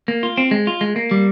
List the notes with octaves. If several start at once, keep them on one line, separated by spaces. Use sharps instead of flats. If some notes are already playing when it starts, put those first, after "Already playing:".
A#3
F4
C4
G#3
F4
G#3
A#3
G3